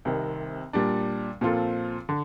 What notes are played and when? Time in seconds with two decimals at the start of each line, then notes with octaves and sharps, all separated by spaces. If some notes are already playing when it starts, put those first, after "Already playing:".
0.05 C2 C3 D#3
0.73 A#2 G3 D4
1.41 A#2 F3 C4 F4 A4
2.09 D3